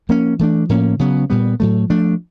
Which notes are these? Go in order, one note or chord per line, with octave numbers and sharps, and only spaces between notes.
F3 A#3 C#4
E3 A3 D4
A2 F3 A#3 C#4
C#3 F#3 B3
A#2 G3 B3
A2 F#3 A3
F3 A3 D4